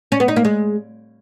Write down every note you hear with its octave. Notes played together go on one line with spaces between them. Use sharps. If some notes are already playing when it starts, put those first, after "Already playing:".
C#4
B3
D#4
A#3
G#3